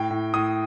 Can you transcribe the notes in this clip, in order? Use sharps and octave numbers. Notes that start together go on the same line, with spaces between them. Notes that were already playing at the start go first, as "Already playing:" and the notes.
Already playing: A2 G5
A2
A2 D#6